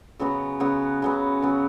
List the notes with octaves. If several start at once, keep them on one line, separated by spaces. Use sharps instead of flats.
C#3 F#3 B3 F#4
C#3 F#3 B3 F#4
C#3 F#3 B3
C#3 F#3 B3